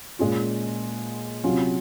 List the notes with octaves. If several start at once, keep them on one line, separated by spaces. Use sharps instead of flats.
A#2 G#3 C#4 F4
C3 F#3 C#4 F4